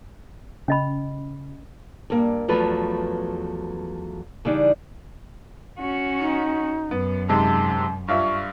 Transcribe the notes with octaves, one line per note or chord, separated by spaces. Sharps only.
C#3 C#4 D#5 B5
G2 A#3
E2 F3 F#3 A3 B4
C#3 E3 G3 D4 D#4
C#4 F#4
D#4
F#2 B3
G#2 C3 G#3 A5
G2 F4 E5 C#6